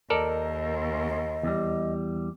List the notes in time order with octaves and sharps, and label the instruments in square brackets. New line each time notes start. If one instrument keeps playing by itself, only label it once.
[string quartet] D#2 [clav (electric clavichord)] A4 A#4 D5 [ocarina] D#5
[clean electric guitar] E2 G3